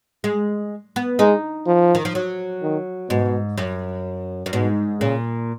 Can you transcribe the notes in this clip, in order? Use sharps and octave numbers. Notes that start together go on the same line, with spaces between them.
G#3
B3
G#3 D#4
F3
D#3
F3
F#3
D#3
G#2 B2
F#2
F#2
G#2 B2
A#2 C#3